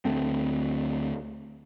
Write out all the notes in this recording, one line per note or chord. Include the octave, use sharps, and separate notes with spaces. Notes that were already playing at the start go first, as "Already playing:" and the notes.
D2 A3 C4